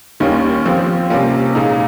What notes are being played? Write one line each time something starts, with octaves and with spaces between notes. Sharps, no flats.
D#2 D#3 G3 A#3 C#4
F3 C4 G4
C3 G3 A#3 C#4 F4
A#2 G#3 D#4